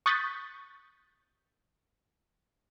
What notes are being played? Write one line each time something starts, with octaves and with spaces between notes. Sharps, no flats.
C#6 D#6 F#6 G6 A6 B6